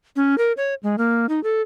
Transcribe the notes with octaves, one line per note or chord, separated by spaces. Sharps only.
C#4
A#4
C#5
G#3
A#3
D#4
A4